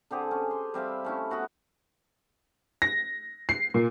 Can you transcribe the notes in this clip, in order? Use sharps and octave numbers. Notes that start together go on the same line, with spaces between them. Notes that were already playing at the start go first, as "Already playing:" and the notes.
D3 C4 G4 G#4
C#4
C6
G3 C4 E5 F5
A3 C#4 E4
B3 E4 F#4 B4
A#6
C7
A#2